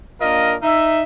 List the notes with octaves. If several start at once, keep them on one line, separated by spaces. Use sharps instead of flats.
A#3 D4 F4 A#4 D#5
D#4 E5